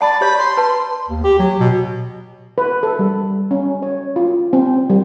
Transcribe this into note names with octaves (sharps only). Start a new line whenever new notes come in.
D5 F#5 A5 B5
G4 C#5 B5
C6
B4 A5
D#2
G4
F#3
B2
B4
A4
G3
C#4
C#5
F4
C4
G3